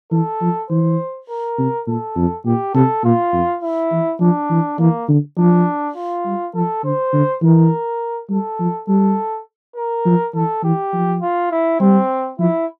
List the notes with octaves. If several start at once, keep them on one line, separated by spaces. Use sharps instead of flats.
E3 A4
F3
E3 C5
A#4
C3
A#2 A4
F2
A#2 G4
C3 A4
A#2 F4
F2
E4
E3
F3 D4
E3
E3 A#3
D3
F3 D4
F4
G3
F3 A4
D3 C5
D3
E3 A#4
G3 A4
F3
G3 A4
A#4
F3
E3 A4
E3 G4
F3
F4
E4
G3 C4
F3 E4